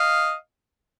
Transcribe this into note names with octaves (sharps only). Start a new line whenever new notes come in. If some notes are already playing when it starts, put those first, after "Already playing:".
Already playing: D#5 F5